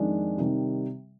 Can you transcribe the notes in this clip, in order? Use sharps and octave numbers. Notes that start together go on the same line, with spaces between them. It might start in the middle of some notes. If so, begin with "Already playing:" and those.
Already playing: F2 D#3 G#3 D4
C3 D#3 G3